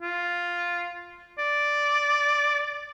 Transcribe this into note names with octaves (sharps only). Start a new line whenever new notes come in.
F4
D5